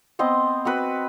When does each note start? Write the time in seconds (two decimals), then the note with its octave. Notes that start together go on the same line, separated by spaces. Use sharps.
0.19 B3 C4 C5 D#5
0.65 C4 F#4 B4